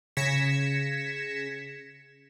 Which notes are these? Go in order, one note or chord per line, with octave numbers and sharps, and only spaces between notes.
C#3 G#6 A#6 B6 C#7 E7